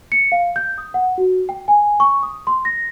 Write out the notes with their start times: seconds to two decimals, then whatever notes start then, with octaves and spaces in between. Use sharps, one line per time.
0.12 C#7
0.32 F5
0.56 G6
0.78 D#6
0.94 F#5
1.18 F#4
1.49 G5
1.68 G#5
2.00 C#6
2.23 D#6
2.47 C6
2.65 A#6